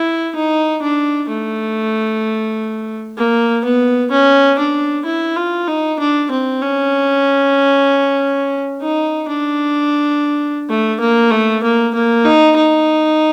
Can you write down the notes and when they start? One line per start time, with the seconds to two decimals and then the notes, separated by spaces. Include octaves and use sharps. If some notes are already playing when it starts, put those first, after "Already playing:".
Already playing: E4
0.35 D#4
0.82 D4
1.28 A3
3.17 A#3
3.65 B3
4.11 C#4
4.58 D4
5.05 E4
5.36 F4
5.67 D#4
5.99 D4
6.31 C4
6.62 C#4
8.81 D#4
9.28 D4
10.69 A3
11.00 A#3
11.31 A3
11.63 A#3
11.94 A#3
12.25 D#4
12.56 D#4